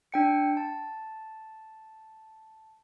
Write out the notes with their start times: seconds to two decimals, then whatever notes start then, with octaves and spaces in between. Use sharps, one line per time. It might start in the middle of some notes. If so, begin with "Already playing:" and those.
0.12 D4 G5 C#7
0.57 A5